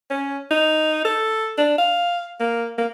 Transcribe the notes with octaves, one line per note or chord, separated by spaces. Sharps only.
C#4
D#4
A4
D4
F5
A#3
A#3